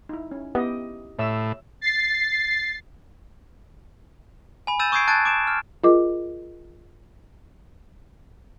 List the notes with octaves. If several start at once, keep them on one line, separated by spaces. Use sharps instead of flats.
D#4 E4
C#4
B3 E4 G4 D#5
A2 C#5 E5 E6
A6 C7
G#5 B5
E6 G6 A6 D#7 E7
C#6 D#6 G6 G#6 C7 D7
A5 F#6 G#6 A6 D7
D6 D7 E7
F6
F4 G#4 A#4 D#5 D6